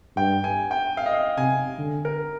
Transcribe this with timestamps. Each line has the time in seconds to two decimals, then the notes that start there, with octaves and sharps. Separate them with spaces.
0.17 G2 G5
0.44 G#5
0.71 G5
0.97 F5
1.06 D#5
1.14 F5
1.37 C3 G#5
1.78 D3
2.05 A#4